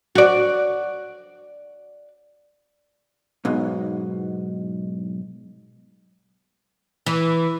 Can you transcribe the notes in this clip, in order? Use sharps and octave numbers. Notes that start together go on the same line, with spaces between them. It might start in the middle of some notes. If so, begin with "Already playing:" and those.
F#4 D5
B1 G#2 B2
E3